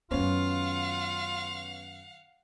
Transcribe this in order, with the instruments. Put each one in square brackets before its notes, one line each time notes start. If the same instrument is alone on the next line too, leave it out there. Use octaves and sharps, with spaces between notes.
[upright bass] F#2 D#3 [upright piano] B3 C#4 [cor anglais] F4 [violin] F5 F#5